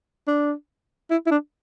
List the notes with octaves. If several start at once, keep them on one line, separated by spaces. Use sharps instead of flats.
D4
E4
E4
D4